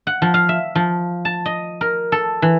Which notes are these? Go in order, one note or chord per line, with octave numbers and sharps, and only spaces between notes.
F#5
F3
F5
E5
F3
A5
D#5
A#4
A4
E3